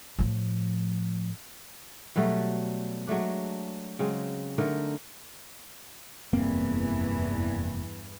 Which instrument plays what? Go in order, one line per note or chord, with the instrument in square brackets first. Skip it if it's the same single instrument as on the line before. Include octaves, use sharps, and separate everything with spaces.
[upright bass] A2 F3
[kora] B2 F#3 G3 A3
F#3 G#3 A3 D4
C#3 F#3 G#3 C4
D3 A3 D#4 A#4
[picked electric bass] F1 A#3 C4 [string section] E2 G2 E3